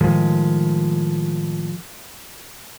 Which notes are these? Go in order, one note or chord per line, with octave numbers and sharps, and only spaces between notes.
A2 D#3 F3 G#3